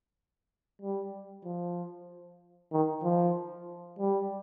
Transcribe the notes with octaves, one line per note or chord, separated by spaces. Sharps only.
G3
F3
D#3
F3
G3